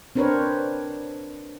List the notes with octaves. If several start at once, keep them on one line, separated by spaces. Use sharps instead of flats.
C4 D4 A#4 B4 C#5